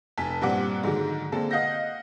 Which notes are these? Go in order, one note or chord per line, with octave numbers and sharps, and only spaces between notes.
F1 G#5 A5 B6
G2 A#2 G3 C4 F#5 D6
G#2 D3 D#3 F#3 G#3
D3 G#3 A#3 C4 A4
D#5 F5 F#5 G6 A#6